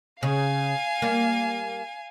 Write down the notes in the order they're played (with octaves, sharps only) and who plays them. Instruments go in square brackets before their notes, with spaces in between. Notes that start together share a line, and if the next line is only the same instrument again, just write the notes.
[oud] C#3 [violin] F5 G#5
[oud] G3 A#3